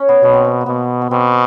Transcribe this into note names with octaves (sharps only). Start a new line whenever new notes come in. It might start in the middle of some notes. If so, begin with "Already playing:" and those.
Already playing: C#4
B3
B2 B3
C4
B3
A#3
B2 B3
B3
B2 C4